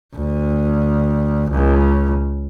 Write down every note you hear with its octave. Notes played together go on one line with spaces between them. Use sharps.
D2
C#2